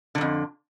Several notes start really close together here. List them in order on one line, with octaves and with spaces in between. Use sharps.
D3 G#2 F2